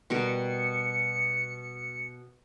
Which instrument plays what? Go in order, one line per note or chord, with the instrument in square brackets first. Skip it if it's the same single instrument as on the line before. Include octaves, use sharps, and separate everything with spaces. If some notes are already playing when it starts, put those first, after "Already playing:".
[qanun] B2 G3 A#4 [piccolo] C#7